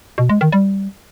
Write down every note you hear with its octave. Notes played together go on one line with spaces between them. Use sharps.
B2
G#3
D#3
G3